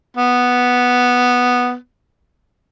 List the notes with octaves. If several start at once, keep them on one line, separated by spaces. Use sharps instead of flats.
B3